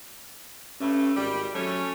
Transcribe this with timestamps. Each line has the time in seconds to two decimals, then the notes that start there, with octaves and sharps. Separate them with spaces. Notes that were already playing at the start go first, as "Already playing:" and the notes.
0.80 G2 A3 C#4
1.16 G#1 G3
1.55 F#3 A3 C#4